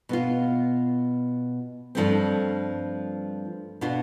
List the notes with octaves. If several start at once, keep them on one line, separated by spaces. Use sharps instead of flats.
B2 B3 F4
G2 F3 A3 C4
B2 B3 D4 F4